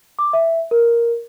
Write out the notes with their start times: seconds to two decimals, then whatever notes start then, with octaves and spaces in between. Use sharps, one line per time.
0.19 D6
0.33 E5
0.71 A#4